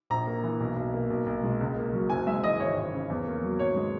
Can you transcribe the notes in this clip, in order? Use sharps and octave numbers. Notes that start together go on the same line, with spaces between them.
A#1 A#5
A#3
E3
B1
B1
A#3
B1
B1
G#3
C#2
A#3
F#3
F#1 G#5
G#3 E5
E3 D#5
G#1 C#5
G#1
C#3
E2
A#3
F#3
G#1 C#5
G#3